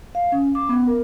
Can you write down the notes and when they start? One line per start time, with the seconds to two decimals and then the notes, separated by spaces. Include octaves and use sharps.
0.15 F5
0.32 C#4
0.55 D6
0.69 B3
0.87 A#4